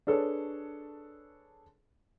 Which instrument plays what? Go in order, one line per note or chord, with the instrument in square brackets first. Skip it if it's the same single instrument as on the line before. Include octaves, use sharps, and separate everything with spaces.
[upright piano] D4 G#4 A4 B4 C#5